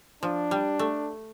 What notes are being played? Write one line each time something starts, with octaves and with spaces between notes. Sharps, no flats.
F3 D4
G3
A3